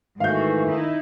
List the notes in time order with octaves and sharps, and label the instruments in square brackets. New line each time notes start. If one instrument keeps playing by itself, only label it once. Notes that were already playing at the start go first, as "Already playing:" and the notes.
[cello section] G#2 F#4 [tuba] D#3 [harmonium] E3 A3 [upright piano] F5 G6
[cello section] D#4 E4